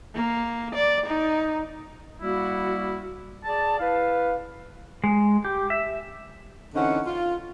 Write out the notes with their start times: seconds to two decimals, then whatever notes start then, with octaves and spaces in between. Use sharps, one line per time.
0.15 A#3
0.75 D5
1.07 D#4
2.22 G3 A#3 E4 F#4
3.45 G#4 D5 A5
3.80 E4 B4 F5
5.04 G#3
5.45 G4
5.70 E5
6.75 D3 E3 C4 C#4 D#4 F#5
7.06 F4